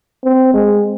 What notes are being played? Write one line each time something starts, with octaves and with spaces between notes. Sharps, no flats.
C4
G#3